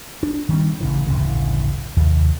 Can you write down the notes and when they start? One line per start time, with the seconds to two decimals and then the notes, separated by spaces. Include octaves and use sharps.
0.23 D4
0.49 D#3 G3 C4
0.80 A1 C#3 E3
1.07 D1 A1 G2 C#3
1.96 D#2 C3